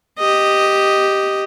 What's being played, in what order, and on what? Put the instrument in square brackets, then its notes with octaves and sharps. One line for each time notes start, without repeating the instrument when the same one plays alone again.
[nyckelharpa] G4 D#5